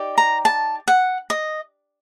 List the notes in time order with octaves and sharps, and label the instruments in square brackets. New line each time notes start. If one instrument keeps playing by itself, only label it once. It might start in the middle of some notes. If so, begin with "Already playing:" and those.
Already playing: [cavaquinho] D#4 G4 D5
A#5
A5
F#5
D#5